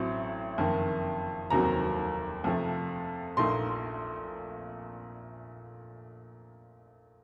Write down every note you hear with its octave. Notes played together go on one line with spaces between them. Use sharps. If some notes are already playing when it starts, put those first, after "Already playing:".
Already playing: A1 A2 F#3 C4
F#1 F2 D#3
F1 D#2 D#3 F#3 C4 A#5
F2 C3 F3 A3
A#1 A#2 A3 D#4 C6